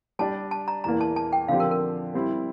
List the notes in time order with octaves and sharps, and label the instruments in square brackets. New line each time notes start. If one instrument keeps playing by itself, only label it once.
[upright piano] G3 D4 G4 D5 [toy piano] A5
[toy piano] A5
A#5
[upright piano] E2 E3 A#3 [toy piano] A#5
[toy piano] A5
A5
G5
[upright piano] D3 F3 C4 G4 [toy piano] F5
[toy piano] A#4
A#4
[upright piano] G3 C4 E4